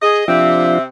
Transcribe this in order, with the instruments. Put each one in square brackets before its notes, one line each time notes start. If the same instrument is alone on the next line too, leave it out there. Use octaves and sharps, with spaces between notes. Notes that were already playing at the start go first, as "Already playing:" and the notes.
[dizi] G#4 [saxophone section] D#5
[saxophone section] C3 C4 [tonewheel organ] F3 D4 F4 [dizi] E5